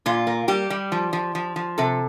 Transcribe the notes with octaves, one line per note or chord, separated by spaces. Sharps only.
A#2 F4
A#3
G3 G4
G3
F3
F3
F3
F3
C3 A4